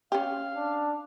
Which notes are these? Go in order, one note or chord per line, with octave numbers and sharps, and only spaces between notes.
C#4 G4 F5
D4